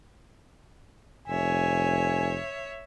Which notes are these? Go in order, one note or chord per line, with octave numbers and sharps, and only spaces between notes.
F1 C#5 E5 G#5